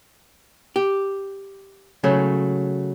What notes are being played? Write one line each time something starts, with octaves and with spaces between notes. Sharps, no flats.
G4
C#3 F#3 A3